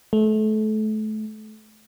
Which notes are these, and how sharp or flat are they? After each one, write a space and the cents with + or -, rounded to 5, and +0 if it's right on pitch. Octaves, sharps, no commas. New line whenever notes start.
A3 -30